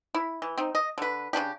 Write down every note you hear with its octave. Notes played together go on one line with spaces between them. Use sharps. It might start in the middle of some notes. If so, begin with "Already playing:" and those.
E4
E3
C4 D#4
D#5
D3 B4
C#3 F3 D4 G4